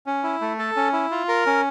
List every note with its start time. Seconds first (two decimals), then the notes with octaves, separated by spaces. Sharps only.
0.06 C#4
0.23 E4
0.41 A3
0.59 A4
0.76 C#4
0.93 E4
1.11 F4
1.28 A#4
1.46 C#4